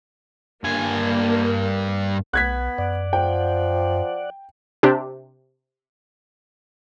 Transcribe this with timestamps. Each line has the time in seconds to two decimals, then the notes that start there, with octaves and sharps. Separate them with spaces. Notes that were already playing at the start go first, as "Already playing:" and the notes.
0.64 G2 A#3 G#5
2.33 B1 B3 F#6 G#6 B6
2.78 F#2 D5 F#5
3.13 F3 G5
4.83 C3 D4 G4